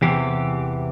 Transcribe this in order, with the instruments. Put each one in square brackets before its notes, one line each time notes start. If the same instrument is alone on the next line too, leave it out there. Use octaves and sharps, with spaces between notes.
[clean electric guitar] E2 C3 E3 G4